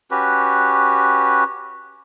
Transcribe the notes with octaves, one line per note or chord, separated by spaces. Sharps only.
C#4 F#4 G4 B4